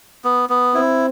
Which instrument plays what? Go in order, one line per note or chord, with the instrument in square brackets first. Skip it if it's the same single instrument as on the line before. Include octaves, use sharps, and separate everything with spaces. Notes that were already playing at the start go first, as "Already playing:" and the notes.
[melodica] B3
B3
[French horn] C4 [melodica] E4